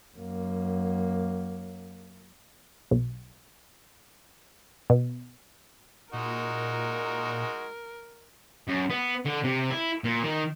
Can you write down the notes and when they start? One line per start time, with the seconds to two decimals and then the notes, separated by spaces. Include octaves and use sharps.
0.17 F#2 A#3
2.91 B1
4.90 B2
6.13 A#2 G#3 D#4 F#4 A#4
8.68 F#2
8.90 B3
9.25 D3
9.44 C3
9.70 E4
10.04 A#2
10.23 D#3